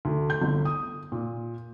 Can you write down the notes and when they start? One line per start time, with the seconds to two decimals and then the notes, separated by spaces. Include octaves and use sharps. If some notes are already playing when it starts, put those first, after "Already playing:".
0.05 D2
0.30 G6
0.41 G1
0.65 D#6
1.12 A#2